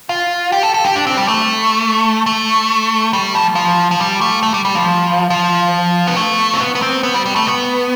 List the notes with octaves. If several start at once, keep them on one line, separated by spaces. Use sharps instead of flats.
F4
G4
A4
A4
G4
D4
C4
G3
A3
A3
G3
F3
F3
F3
G3
A3
A3
G3
G3
F3
F3
B3
A3
C4
B3
B3
C4
B3
G3
G3
A3
B3